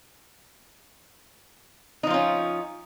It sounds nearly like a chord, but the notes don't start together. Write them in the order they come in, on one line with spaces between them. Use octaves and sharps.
D#4 F3 F4 C#4